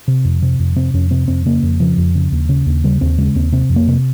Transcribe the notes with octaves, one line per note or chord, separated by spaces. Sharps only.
C3 C4
F2
C3 C4
F2
C3 C4
F2 C#4
C3 C4
F2 C4
C#3 A#3
F2
C#3 F3
F2
C#3
D#2
C#3
D#2
C#3 G3
D#2 C4
C#3 G#3
D#2 C4
C3 C4
F2
A#3
C3